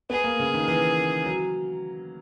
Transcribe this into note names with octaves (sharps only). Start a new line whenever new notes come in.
B3 G#4
A#3
C#3
D#3
E3
F#3